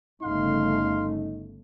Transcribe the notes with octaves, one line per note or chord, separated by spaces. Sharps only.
G1 C#3 A3 D#4 F5 C6